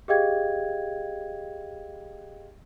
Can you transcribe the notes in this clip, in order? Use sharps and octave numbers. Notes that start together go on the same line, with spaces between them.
G4 G#4 D#5 F5 G5 G#6